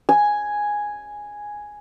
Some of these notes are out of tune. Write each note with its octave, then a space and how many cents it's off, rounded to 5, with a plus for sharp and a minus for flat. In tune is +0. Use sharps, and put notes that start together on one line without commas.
G#5 +0